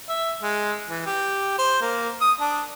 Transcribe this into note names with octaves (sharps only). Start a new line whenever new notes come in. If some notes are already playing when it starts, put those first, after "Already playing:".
E5
G#3
E3
G4
C5
A#3
D#6
D4